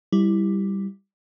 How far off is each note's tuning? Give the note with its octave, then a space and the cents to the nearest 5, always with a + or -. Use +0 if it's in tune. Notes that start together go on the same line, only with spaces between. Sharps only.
G3 +0 E4 +0